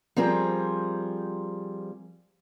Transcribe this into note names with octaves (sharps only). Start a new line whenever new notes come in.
F3 G3 C4 G#4 A#4